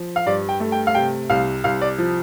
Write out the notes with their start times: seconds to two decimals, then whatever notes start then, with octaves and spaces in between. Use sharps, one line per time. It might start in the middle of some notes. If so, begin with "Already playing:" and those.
Already playing: F3
0.16 F5
0.26 G2 D5
0.49 G5
0.60 A3
0.72 G5
0.87 F5
0.95 C3 G5
1.30 C2 F5
1.64 C2 F5
1.81 D5
1.98 F3